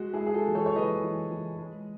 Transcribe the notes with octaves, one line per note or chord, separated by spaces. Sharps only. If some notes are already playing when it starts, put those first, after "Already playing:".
Already playing: G#3 F#4
E4 G#4
G#3
G#4
F#4 A4
E3
A4 C#5
C#5
E3 B4 D#5
E3
E3
G#3